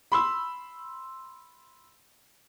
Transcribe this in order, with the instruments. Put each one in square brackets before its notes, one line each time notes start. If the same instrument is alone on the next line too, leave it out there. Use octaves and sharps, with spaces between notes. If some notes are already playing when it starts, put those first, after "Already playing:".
[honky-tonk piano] B5 C6 E6